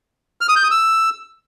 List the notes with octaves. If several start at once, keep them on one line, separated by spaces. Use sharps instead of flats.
F6
D#6
G6
D#6
E6